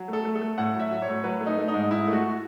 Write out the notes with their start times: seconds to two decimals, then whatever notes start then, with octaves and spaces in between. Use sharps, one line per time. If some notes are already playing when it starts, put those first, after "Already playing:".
Already playing: F#3
0.08 A3
0.13 A4
0.25 A3
0.36 A4
0.42 A3
0.58 A2 F#5
0.75 F#3 E5
0.91 F#3
1.02 C#5
1.08 A2
1.24 F#3 B4
1.41 A3
1.46 D#4
1.58 A3
1.68 D#4
1.74 G#2
1.91 G#2 E4
2.08 A3
2.13 F#4